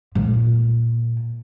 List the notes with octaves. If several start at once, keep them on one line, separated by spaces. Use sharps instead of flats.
A#2